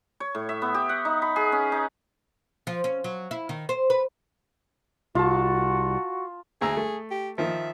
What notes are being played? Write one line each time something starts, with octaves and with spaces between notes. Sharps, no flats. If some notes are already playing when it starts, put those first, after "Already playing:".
C#5
A2
E5
B3
G4
F#5
D#4
B5
G#4
C#4
D#4
F3
C#4
F#3
E4
D#3
C5
B4
C2 F4 F#4 A5
D2 G#4 A#5 E6
A3
G4
D#3 F3 E5